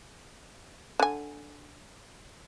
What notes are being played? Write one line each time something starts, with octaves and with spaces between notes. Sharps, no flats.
D3 G#5